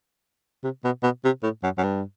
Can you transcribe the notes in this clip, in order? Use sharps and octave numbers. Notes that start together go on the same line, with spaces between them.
C3
B2
B2
C3
A2
F#2
F#2
G2